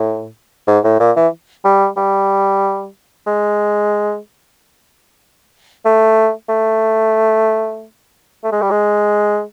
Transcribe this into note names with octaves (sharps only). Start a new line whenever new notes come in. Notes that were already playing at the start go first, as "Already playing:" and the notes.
Already playing: A2
G#2
A2
A#2
E3
G3
G3
G#3
A3
A3
A3
G#3
G3
G#3